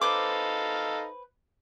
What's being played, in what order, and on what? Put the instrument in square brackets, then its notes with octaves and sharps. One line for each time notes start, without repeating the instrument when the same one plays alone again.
[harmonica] D#4 A4 F5 [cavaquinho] B4 C5 D6